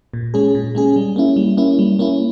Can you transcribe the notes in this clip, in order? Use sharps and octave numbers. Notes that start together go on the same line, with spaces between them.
A#2
G#3 C#4 G#4
A#2
G#3 C#4 G#4
G3
A#3 C#4 E4
G3
A#3 C#4 E4
G3
A#3 C#4 E4